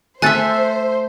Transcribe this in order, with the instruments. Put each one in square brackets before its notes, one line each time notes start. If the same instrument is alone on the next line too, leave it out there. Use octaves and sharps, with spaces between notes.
[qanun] A3 A4 E5 [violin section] C5 [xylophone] G#5 F#6 A6